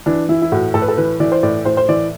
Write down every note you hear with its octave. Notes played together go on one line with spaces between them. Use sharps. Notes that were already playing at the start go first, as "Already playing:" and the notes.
E3 D4
E3 E4
E4
A2 F#4
A2 A4
B4
A4
E3 B4
E3 D5
C5
A2 D5
A2 C5
C5
E3 D5